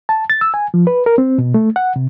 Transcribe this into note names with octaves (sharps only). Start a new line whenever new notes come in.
A5
A6
E6
G#5
F3
B4
A#4
C4
B2
A3
F#5
C3